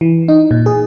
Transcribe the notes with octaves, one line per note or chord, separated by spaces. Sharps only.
E3
D#4
A#2
G#4